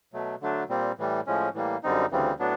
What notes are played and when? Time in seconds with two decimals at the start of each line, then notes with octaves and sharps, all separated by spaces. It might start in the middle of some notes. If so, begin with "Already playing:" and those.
0.13 B2 F#3 A3
0.41 D3 F#3 A3 D4
0.69 A#2 G3 C4
0.98 A2 E3 G3
1.27 A2 F3 G#3 C#4
1.54 A2 E3 G3 A#3
1.83 F#2 D3 G3 C4 D#4
2.11 D2 C#3 E3 G3 C4
2.39 A2 F#3 B3 D4